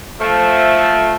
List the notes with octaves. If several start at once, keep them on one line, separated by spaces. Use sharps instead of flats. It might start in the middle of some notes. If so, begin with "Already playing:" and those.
F3 A3